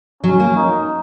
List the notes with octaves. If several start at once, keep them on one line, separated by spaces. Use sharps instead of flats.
F#3 C#4
A#3
D#4